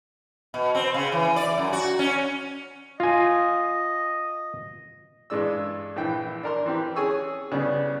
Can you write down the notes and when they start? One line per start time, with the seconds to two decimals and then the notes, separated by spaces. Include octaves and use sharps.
0.54 B2
0.75 C4
0.94 C#3
1.12 E3
1.36 D5
1.58 F#2
1.73 F#4
1.99 C#4
3.00 F4 D#5 G#5
5.30 G2 E3 G#3 D4 E6
5.96 A#1 E3 G5
6.43 D4 A#4 C6
6.66 E3 C4 G4
6.96 C#4 G#4 G#5 C#6 E6
7.52 C#3 G3 B3 D4